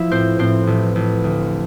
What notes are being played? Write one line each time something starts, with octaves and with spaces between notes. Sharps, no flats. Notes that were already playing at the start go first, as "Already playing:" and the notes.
Already playing: F3 E4 E5
A2 C4 C5
A2 C4 C5
A1
A1
D2